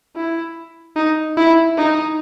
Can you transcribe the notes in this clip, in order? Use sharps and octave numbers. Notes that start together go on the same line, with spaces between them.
E4
D#4
E4
D#4